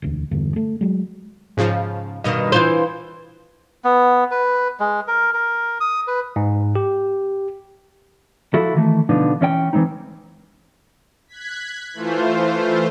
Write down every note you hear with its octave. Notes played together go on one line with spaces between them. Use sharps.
E1 D2
E2 G2 D3
A3
F#3 G#3
G#2 C#3 F3
G2 B2 D#3 D#5
E3 F4 C5
B3
B4
G#3
A#4
A#4
D#6
B4
G#2
G4
F3 E4 F#4 A4
D#3 E3 A3
B2 D3 F3 B3 D4 D#4
E3 C#4 C#5 G5
E3 F#3 G#3 C4 D#4
F#6 G#6 B6
E3 A3 F4 C5